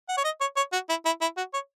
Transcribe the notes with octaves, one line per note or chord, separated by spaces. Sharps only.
F#5
C#5
D#5
C#5
C#5
F#4
E4
E4
E4
F#4
C#5